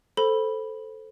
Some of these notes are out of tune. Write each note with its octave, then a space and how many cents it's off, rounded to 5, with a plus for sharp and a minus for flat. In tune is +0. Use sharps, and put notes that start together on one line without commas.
A4 +0 C5 +0 B5 -5